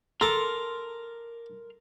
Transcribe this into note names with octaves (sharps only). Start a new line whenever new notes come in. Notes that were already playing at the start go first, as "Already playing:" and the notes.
A4 A#4 A#5 C6 D6 F6